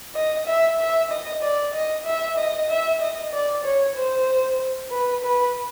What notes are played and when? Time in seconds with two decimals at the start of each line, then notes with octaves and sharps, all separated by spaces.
0.15 D#5
0.46 E5
0.79 E5
1.10 D#5
1.42 D5
1.74 D#5
2.06 E5
2.37 D#5
2.69 E5
3.01 D#5
3.33 D5
3.64 C#5
3.96 C5
4.91 B4
5.23 B4